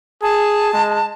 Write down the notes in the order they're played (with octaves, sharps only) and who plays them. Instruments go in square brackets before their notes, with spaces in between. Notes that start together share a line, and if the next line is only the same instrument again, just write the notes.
[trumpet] G#4 [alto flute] A5
[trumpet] G#3